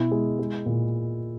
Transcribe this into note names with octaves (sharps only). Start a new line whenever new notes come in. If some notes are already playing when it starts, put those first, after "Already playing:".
Already playing: B2 E4
G#3
G#3
A#2